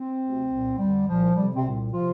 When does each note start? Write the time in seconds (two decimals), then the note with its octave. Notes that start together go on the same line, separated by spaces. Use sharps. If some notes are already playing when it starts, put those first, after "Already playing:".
Already playing: C4
0.22 D2 C3
0.51 C2 A#2
0.79 F2 D3 G3
1.07 C2 A#2 F3
1.36 F2 C3 G3
1.55 C3 C4
1.65 C2 A#2
1.93 C3 F3 F4